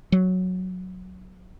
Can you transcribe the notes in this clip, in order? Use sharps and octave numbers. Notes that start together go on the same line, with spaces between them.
F#3